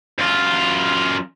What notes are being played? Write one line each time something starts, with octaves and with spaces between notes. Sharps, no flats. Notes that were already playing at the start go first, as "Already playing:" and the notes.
F#2 F4